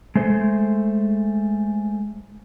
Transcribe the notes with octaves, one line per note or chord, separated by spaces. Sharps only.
G#3 A3 C5